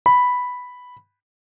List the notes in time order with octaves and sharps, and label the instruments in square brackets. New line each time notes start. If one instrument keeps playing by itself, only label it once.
[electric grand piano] B5